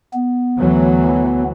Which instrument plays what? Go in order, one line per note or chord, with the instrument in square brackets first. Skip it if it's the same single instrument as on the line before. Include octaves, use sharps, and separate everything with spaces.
[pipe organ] B3
[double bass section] D2 E3 F#3